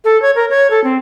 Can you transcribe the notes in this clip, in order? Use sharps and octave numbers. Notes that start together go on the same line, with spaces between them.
A4
C#5
A#4
C#5
A4
C4